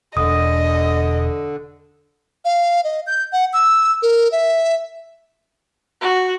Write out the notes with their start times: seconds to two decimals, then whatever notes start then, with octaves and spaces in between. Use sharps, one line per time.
0.17 E1 D3 D#5 D#6
2.45 F5
2.84 D#5
3.07 G6
3.33 F#5
3.53 E6
4.02 A#4
4.32 E5
6.01 F#4